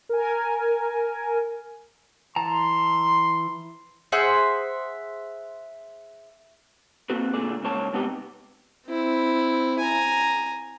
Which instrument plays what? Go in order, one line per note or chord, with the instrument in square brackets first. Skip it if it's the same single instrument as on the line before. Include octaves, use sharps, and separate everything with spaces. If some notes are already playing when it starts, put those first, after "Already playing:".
[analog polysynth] A#4 G#5
[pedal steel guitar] E3 A5 A#5 [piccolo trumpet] C6
[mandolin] G#4 C5 E5 F#5
[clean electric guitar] A#3 C4 F#4 A4 B4
A#2 D3 A3 G#4 D5
G#2 C#3 A#3 C#5 A5
G#2 C3 B3 D#4 G4
[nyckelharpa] C4 E4
G#5 A#5